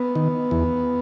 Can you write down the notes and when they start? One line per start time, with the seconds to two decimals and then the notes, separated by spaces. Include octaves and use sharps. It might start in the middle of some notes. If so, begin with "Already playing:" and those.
Already playing: B3
0.15 D#3
0.51 E2